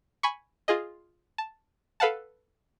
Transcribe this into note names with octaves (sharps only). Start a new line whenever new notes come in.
G#5 B5 C#6
F4 G#4 D#5
A5
A4 B4 F5 F#5 A5